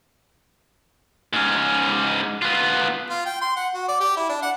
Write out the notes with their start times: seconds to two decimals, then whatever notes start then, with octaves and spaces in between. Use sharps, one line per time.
1.33 G#2 C#4
2.42 B3 F4
3.10 F4
3.25 G5
3.41 C6
3.56 F#5
3.74 F#4
3.88 D5
4.00 G4
4.17 E4
4.29 D4
4.42 F#5